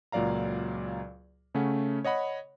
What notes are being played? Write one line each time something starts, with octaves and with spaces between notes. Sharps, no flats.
C#2 A#2 F#3 D5 F5 A#5
C#3 A3 C#4 F#5
C#5 D#5 F#5 B5